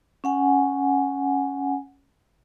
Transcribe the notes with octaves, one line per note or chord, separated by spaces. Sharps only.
C#4 F#5 G#5